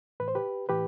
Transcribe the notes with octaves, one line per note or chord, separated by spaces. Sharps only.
A2 E3 B4
C5
G4 B4
A2 E3 G4 B4